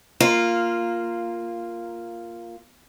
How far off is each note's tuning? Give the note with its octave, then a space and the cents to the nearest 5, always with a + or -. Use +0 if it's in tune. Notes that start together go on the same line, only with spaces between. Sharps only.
A#3 +0 F4 -5 A#4 +0